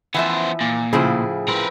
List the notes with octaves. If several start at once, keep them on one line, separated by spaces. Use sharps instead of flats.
E3 F3 B3 C5 E5
A#2
A2 C#3 F3 E4 G#4
C4 A#4 B4